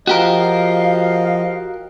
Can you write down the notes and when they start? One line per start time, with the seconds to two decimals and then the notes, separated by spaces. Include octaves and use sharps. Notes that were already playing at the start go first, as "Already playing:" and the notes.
0.07 F3 F#4 G4 A#4 D#5 F5